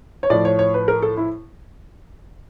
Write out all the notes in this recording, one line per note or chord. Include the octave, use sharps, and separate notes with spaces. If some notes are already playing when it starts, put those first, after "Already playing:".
C#5
A2 F3 D5
C#5
C#5
B4
A#4
A4
E4